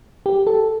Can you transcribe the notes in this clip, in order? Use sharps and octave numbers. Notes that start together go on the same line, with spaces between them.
G4
A4